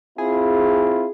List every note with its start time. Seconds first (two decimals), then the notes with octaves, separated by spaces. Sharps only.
0.18 C4 E4 F4 G#4